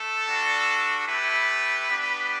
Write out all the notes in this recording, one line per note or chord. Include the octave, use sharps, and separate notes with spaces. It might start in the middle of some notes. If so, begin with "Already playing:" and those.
Already playing: A3 A4
G3 D4 F#4
A3 E4 G4 B4
B3 D4 G4